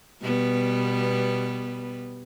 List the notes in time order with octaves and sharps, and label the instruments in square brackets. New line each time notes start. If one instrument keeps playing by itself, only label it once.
[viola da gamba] B2 G3 B3